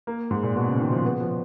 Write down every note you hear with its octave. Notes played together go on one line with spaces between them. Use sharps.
A#3
G#2
A#2
B2
C#3
D#3
F3
B3
F3